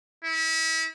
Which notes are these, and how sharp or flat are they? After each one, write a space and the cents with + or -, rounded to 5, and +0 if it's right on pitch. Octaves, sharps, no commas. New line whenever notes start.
E4 -35